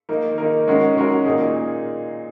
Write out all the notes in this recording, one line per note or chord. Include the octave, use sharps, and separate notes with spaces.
D#3 A#3 D#4 A#4
D#3 A#3 D#4 A#4
D#3 G#3 C#4 F#4 A#4
D#3 G#3 C#4 F#4 A#4
A#2 A#3 D#4 G#4